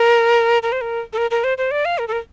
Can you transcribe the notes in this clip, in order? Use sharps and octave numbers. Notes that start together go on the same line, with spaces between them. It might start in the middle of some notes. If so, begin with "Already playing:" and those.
Already playing: A#4
A#4
C5
A#4
A4
A#4
A#4
C5
C5
D5
F5
A#4
A4
A#4